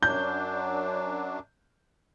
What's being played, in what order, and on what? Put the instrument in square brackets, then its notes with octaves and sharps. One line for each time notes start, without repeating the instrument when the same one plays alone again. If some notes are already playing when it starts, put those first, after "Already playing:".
[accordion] F#2 F#3 D4 [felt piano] G6